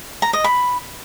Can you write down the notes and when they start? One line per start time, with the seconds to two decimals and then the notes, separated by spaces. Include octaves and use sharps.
0.22 A#5
0.33 D#5
0.44 B5